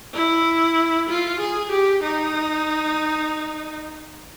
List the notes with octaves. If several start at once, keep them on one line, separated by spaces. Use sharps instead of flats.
E4
F4
G#4
G4
D#4